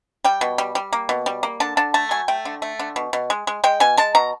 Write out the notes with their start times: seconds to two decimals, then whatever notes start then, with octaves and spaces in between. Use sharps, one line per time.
0.24 G3 G5
0.41 B2
0.58 G3
0.75 G3
0.93 A#3
1.09 B2
1.26 G3
1.43 A#3
1.60 D3 A5
1.77 D3 A5
1.94 A3 A5
2.11 F#3 G#5
2.28 A3 G5
2.45 D3
2.62 A3
2.79 D3
2.96 B2
3.13 B2
3.30 G#3
3.47 G#3
3.64 G#3 G5
3.80 B2 G#5
3.97 G#3 A5
4.15 B2 A#5